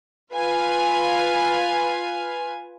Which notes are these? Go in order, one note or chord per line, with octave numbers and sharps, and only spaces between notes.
F4 B4 F5 G#5